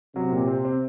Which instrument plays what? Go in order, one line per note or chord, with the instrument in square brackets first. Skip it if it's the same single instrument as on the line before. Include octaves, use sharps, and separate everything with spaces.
[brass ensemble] C3 [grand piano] F#3
[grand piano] A#2
C4
C4